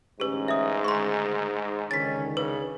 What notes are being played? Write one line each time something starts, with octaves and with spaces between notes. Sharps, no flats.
A1 D2 G#2 C#4 G4 B4
E5 D#6
D2 D#3 G#3 C6 C#6
C#2 D3 D#3 C#4 A6 B6
C#3 B4